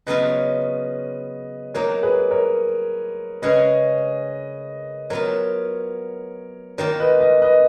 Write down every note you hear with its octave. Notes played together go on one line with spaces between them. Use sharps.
C#3 F#3 B3 F4 B4 D#5
F#3 A#3 D#4 A#4 C#5
G#4 B4
A#4 C#5
C#3 G#3 C#4 B4 D#5
F#3 B3 F4 A#4 C#5
D#3 A#3 F4 A#4 C#5
B4 D#5
B4 D#5
B4 D#5